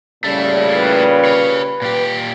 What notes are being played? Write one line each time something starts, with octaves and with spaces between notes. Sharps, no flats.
A#2 C#3 G3 A3 E4
B4
C#5 F5
A#2 G4